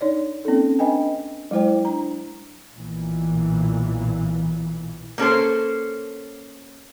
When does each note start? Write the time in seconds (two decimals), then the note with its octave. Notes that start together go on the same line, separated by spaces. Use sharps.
0.01 D4 D#4 C#5 D5
0.45 A#3 C4 C#4 D#4 A4
0.79 D4 B4 D#5 G5 G#5
1.51 F#3 G#3 E4 C5 G5
1.85 D4 A#5
2.75 B1 A#2 E3
5.18 A#3 C#4 A4 C5